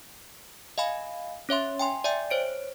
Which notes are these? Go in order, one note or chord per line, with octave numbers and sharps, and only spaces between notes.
D#5 F5 G#5 B5
C#4 C#5 E5 C6
G5 G#5 C6
D5 E5 G5 G#5
C5 C#5 D7